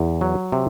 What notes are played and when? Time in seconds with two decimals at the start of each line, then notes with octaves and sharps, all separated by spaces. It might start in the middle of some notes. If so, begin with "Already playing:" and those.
Already playing: E2
0.21 F#3
0.52 C3